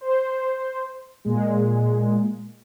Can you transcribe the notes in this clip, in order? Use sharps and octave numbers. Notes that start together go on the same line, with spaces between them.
C5
A#2 G#3